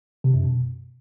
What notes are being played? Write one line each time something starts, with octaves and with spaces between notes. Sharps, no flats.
C3
F#2
B2